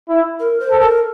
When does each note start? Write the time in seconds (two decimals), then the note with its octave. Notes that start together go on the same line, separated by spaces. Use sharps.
0.09 E4
0.40 A#4
0.60 C5
0.71 A4
0.81 A#4